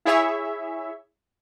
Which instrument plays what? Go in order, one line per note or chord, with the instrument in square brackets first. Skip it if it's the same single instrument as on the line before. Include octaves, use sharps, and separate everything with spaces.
[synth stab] E4 G#4 C#5 E5